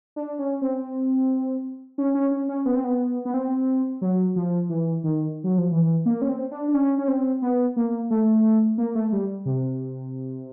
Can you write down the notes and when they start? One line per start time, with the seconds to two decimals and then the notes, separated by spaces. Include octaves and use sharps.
0.16 D4
0.39 C#4
0.62 C4
1.98 C#4
2.15 C#4
2.31 C#4
2.49 C#4
2.66 B3
2.75 C4
2.84 B3
3.25 B3
3.34 C4
4.01 F#3
4.36 F3
4.69 E3
5.04 D#3
5.44 F#3
5.58 F3
5.72 E3
6.06 A#3
6.22 C#4
6.29 C4
6.51 D4
6.68 D4
6.74 C#4
6.99 C#4
7.08 C4
7.42 B3
7.76 A#3
8.10 A3
8.78 A#3
8.95 A3
9.12 G3
9.46 C3